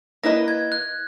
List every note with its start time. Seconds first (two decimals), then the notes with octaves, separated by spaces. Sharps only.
0.23 A#3 E4 B4 D#5 A#6
0.48 G#6
0.72 F#6